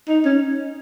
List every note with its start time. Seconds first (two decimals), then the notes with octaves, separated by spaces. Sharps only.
0.08 D#4
0.25 C#4